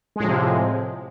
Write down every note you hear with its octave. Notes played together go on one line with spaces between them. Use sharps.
A2 C3 F3 G#3